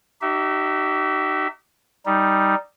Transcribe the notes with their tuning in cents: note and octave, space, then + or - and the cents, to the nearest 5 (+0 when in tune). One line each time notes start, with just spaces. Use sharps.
D#4 -35 G4 -45 E5 +0
G3 +0 D#4 +0